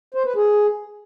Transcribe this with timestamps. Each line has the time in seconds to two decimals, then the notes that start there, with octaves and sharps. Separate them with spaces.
0.14 C5
0.25 B4
0.36 G#4